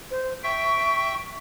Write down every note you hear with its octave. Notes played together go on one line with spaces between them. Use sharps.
C5
E5 G5 C#6